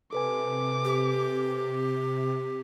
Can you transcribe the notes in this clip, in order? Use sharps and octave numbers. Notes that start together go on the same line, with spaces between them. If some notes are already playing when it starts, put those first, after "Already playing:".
C3 A4 B4 G#5 D6
G4